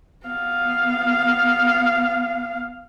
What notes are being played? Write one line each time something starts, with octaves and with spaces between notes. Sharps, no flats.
B3 F5